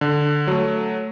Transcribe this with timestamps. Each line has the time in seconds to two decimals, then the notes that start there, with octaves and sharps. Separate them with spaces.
0.01 D3
0.47 F#3 A3